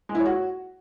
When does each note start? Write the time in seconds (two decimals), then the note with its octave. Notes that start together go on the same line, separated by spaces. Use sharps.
0.09 G#3
0.15 E4
0.20 C#5
0.26 F#4